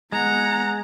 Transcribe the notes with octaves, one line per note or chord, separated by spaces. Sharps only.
G#3 B3 F#5 A#5